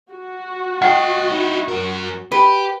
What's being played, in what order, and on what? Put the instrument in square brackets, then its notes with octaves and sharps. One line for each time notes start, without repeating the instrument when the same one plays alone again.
[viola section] F#4
[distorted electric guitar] C#5 D#5 [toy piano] F#5 G5
[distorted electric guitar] D#4 E4
F#2 A#4
[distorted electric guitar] G4 [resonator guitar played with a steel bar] B4